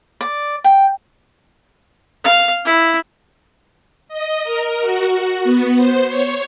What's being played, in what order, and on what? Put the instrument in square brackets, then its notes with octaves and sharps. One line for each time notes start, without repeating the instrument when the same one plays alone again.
[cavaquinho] D5
G5
[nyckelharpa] F5
E4
[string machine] D#5
A#4
F#4
B3
C5
C#5